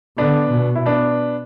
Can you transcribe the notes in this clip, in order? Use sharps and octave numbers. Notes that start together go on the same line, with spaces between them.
D3 B3 D4
B2
E4
B3 D4